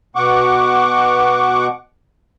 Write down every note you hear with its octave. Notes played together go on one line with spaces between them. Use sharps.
B2 F#5 C#6 D6